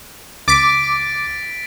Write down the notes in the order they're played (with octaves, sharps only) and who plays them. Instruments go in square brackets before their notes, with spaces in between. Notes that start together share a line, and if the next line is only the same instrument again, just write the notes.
[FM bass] C#2 [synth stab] D6 [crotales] A6 B6 D7